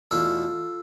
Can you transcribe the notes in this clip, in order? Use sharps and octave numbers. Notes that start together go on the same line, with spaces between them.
E2 B2 A3 F4 A4